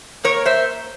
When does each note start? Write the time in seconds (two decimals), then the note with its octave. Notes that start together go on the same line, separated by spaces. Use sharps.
0.24 A#3 A#4 C#5
0.46 C5 E5